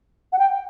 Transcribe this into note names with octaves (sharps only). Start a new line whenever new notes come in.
F#5
G5